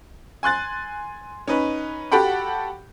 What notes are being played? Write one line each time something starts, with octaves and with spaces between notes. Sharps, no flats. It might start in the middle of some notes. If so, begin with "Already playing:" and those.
G#5 C6 F#6 A6
C#4 D#4 B4
F#4 G4 A4 F#5 G5 B5